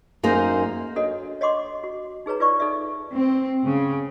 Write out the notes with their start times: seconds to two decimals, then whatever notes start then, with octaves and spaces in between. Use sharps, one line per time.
0.23 F#2 A#3 D#4 G#4 C5
0.96 D4 F#4 A4 C#5 D#5
1.41 C#5 D#5 F#5 C6 D6
1.84 F#4
2.26 D#4 G#4 B4 C#5 A#5
2.40 F4 B4 D5 C#6
2.60 D#4 A4 D5 E5
3.13 C4
3.64 C#3